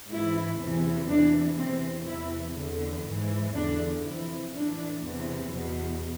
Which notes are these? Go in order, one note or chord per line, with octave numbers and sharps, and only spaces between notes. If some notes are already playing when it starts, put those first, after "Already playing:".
G#2 E3 E4
E2 C3 E3
E2 C3 E3 D4
E2 C3 E3 C4
E2 C3 E3 E4
E2 D3
G#2 E3
E2 D3 D4
F2 C3 E3 E4
A2 E3 D4
E2 C3 E3
E2 B2